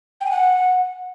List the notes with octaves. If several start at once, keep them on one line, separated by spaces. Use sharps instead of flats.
G5
G#5
F#5